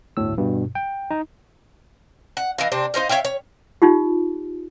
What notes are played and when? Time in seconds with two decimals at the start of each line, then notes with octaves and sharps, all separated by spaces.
0.17 G1 D2 A2 E6
0.38 G2 B2
0.75 G5
1.11 D#4
2.37 F#5
2.58 E3 D#5 F5
2.72 C3 C4 D4
2.94 D#4 C5 D#5 F5
3.09 C#5 E5 F5 G5
3.25 C#5
3.82 D#4 F4 G4